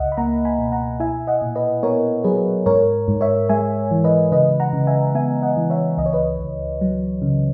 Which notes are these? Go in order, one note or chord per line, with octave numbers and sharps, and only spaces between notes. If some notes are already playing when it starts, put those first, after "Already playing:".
Already playing: C#2 D#5 E5 F#5
B5
A#3 F#5 A#5
G#5 B5
B2
F#5 A#5
E4 E5 G#5
D#5 F#5
A#2
B4 D#5
B3 A#4 C#5
F#3 G#4 B4
G#2 A#4 C#5
G#2
C#5 E5
G#3 E5 G#5
E3
B4 D#5
C#3 B4 D#5
F#5 A#5
C#3
E5 G#5
B3 E5 G#5
D#5 F#5
E3
C#5 E5
C#2 D#5
C#5
B4 D#5
C#2
F#3
C#3